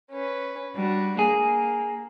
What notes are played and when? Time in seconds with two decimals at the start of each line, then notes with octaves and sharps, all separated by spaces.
0.12 C#4 B4
0.75 G3 D4 F#4
1.19 A#3 G#4